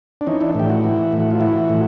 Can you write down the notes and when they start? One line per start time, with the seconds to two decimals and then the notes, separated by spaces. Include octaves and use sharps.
0.21 D4
0.27 E3 C#4 D#4
0.41 D4 E4
0.55 A2 G4
0.69 E4 F#4
0.84 E3
1.12 A2
1.20 E4
1.31 F4
1.40 E3 E4 F#4
1.69 A2